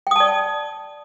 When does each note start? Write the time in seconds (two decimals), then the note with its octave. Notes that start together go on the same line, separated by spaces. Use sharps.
0.07 G5
0.11 D#6
0.16 A5
0.20 D5